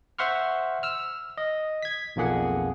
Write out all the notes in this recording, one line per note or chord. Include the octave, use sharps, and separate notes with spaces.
C5 E5 F#5 C6 C#6 F6
E6 F6
D#5
G#6 B6
B1 F2 A#3 G#4 F#5